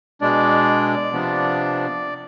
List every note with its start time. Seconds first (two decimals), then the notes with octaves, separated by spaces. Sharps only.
0.21 B2 G#3 D4 D5
1.13 C3 F3 B3 D4